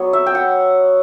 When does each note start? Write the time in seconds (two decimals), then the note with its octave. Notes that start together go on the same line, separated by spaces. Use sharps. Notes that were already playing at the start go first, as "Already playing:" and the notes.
Already playing: F#3 B3 C#5
0.13 E5
0.26 G5
0.35 F#5